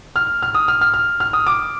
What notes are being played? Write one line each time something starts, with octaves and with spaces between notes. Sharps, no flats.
F6
F6
D#6
F6
F6
F6
F6
D#6
D6